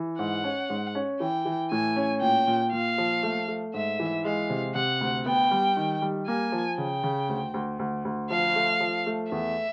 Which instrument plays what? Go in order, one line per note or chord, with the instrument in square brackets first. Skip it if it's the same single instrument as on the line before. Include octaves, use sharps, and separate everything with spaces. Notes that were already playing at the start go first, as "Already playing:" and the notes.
Already playing: [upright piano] E3
[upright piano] G#2 [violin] F#5
[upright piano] C#4
G#2
C#4
[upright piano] E3 [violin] G5
[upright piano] E3
[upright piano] A2 [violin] G#5
[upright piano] C#4
[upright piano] A#2 [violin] G5
[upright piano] A#2
[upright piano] A#2 [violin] F5
[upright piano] F3
A3
A3
[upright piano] G#2 [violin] E5
[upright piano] E3
[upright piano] G#3 [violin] F5
[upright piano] C3
[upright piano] C3 [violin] F#5
[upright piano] D2
[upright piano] B3 [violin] G5
[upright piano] G3
D#3
G3
[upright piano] A#3 [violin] G#5
[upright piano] F3
[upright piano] C#3 [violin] G5
[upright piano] C#3
D2
D2
D2
D2
[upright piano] F3 [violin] F5
[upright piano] A3
F3
A3
[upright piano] E2 [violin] E5